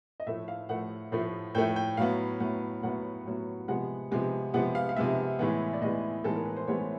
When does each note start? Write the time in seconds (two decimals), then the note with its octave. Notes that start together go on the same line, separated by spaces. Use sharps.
0.20 D#5
0.26 A2 F3 A3 E5
0.48 F5
0.69 A2 F3 A3 F#5
1.12 A2 F3 A3
1.55 A2 F3 A3 G5
1.76 G5
1.97 A2 F#3 B3 F5
2.40 A2 F#3 B3
2.83 A2 F#3 B3 F#5
3.26 A2 F#3 B3
3.68 C3 F3 G#3 B3 F#5
4.11 C3 F3 G#3 B3
4.54 C3 F3 G#3 B3 F#5
4.75 F5
4.89 F5
4.96 C3 F3 G#3 B3 E5
5.39 A2 E3 G#3 B3
5.73 D5
5.82 A2 E3 G#3 B3 D#5
6.24 A2 E3 G#3 B3 A4
6.35 A#4
6.46 B4
6.57 C5
6.67 A2 E3 G#3 B3 C#5